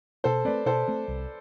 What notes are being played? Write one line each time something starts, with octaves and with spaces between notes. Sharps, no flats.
B2 A4 C5
A3 C4 B4 D5
B2 A4 C5
A3 C4
C2